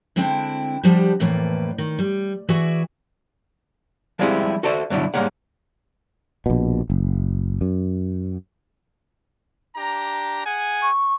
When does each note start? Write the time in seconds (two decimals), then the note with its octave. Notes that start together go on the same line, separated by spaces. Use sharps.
0.16 D3 G#3 C4 E4 G5 A5
0.83 F3 G3 D4 F#4 G4
1.20 F2 A2 E3 A#3 B4 D5
1.78 D#3
1.99 G3
2.49 E3 F#4 G#4 D5 E5 G#5
4.19 F3 G3 G#3 C4 E4 G4
4.63 F#4 A4 C5 D5 E5
4.90 G2 B2 D3 F#3 D4 E4
5.14 G#2 G3 A#3 C#5 F#5
6.46 A#1 B2
6.90 F#1
7.61 F#2
9.76 D4 G4 A#5
10.45 G#4 F#5 G#5
10.82 C#6